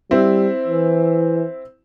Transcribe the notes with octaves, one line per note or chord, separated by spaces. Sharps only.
G3 C4 E4
E3